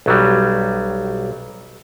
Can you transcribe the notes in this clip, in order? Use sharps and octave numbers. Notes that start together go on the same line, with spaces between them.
B1 F#3 G3